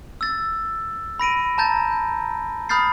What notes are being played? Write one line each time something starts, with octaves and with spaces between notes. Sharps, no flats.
E6 A6
B5 A#6 D7 D#7
A5 A#5 G6 A6
B5 D#6 F6 G6 A6 C7